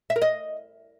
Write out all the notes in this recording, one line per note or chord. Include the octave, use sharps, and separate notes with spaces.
E5
A#4
D#5